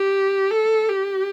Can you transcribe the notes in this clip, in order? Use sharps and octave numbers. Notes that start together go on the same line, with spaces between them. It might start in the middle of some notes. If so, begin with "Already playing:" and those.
Already playing: G4
A4
G4